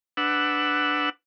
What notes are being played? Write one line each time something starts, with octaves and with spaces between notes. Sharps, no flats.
D4 B4 F#5 E6